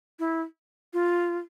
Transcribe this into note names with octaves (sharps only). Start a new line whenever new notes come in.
E4
F4